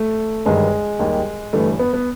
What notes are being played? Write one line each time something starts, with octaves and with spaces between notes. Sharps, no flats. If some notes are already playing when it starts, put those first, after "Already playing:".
Already playing: A3
G1 G2 D#3 G#3
D#2 D#3 G3
G1 G2 E3 A3
B3
B3